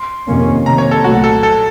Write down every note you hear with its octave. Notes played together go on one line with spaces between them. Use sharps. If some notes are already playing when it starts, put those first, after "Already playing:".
Already playing: C6
F2 C3 D#3 A#3 C#4
C3 D#3 A#3 A#5
C#5
A4
C2 A#2 F#3 A3 F#4
A4
A4